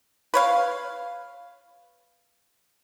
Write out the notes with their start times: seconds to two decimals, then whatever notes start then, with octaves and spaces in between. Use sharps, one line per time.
0.34 B4 C#5 F5